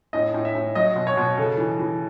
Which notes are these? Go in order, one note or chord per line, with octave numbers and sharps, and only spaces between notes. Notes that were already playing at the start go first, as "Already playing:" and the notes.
A2 D#5
A2
E5
A2
F#3 D#5
B2
C#5
B2
C#3 A4
E3
E3